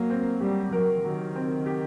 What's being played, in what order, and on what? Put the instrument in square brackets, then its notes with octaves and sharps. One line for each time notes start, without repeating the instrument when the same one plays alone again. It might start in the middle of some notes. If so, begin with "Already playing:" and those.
Already playing: [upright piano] F#3 [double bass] A#3
[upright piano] C4
[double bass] G3 [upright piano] G4
[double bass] F#3 [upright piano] A#4
[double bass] D#3 [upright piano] F#3
[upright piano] C4
G4